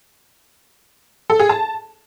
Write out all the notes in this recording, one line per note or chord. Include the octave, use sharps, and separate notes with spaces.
A4
G#4
A5